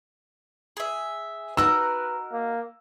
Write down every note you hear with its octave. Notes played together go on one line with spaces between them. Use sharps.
G#4 E5
D#4 F#4 A#4 B4 E6
A#3